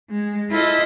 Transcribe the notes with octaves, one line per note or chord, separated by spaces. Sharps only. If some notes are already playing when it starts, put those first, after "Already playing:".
G#3
E4 F4 A4 D#5